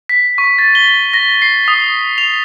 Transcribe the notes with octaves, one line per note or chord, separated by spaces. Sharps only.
B6
C#6
A6
G7
G7
A#6
C7
D#6
F7